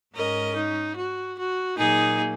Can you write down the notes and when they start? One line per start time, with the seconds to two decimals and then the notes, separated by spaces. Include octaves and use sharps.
0.14 G#2 G#3 C#4 A#4 D#5
0.55 D#4
0.95 F#4
1.37 F#4
1.77 A#2 F#3 A#3 D#4 G#4